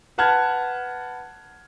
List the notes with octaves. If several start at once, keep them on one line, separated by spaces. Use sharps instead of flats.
B4 F#5 A5 F6 F#6 G#6